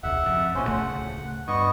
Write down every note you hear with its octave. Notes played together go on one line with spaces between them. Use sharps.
E1 C#2 E5 F#5
F2
B1 A#2 C#4 C5
D1 C#3 A3 F#5
G2 B3 D#5 C#6